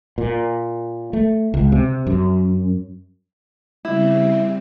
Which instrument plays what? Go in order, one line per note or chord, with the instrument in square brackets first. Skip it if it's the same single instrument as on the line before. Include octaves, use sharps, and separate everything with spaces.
[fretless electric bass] A#2
A3
C#2
C3
F#2
[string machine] C#3 G3 C4 [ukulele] E4